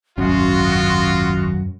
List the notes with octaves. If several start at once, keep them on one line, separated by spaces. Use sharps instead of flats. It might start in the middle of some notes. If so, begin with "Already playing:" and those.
D#1 G#1 F#2 C#4 F4 F#4 C6 D#6